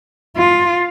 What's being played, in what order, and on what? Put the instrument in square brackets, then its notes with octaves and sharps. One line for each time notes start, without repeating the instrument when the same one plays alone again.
[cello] F4